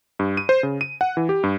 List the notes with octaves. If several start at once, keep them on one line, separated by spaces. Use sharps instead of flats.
G2
D#7
C5
C#3
D#7
F#5
E3
G4
G2